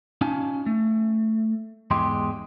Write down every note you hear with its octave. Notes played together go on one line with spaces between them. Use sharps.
C#4 D#4 F4 G#5 A5
A3
E2 G#2 G#3 G4 C6